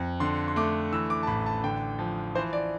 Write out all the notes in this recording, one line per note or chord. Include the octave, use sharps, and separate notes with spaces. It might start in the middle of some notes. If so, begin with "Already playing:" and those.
Already playing: F2
D3 C6
C6
A3 D6
E3 E6
D6
A5
A1 B5
A5
D3 G5
F3
E3 C5
D5